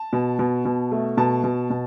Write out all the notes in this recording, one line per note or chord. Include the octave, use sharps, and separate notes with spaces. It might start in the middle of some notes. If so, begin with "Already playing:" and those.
Already playing: A5
B2
B2
B2
A3
B2 A5
B2
B2